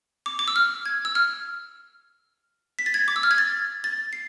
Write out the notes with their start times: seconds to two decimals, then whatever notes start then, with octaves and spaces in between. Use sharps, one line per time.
0.26 D6
0.39 D6
0.48 E6
0.56 F6
0.86 G#6
1.05 E6
1.15 F6
2.79 B6
2.86 A6
2.94 G#6
3.08 D6
3.16 E6
3.23 F6
3.31 G#6
3.38 A6
3.84 A6
4.13 C7